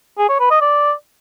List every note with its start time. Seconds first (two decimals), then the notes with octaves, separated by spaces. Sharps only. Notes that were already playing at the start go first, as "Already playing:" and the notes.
0.18 G#4
0.29 C#5
0.40 B4
0.51 D#5
0.61 D5